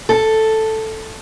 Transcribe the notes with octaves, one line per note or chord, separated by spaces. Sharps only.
A4